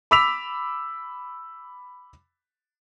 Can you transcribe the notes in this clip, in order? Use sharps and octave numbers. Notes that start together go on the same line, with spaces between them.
B5 D6 E6 B6 F7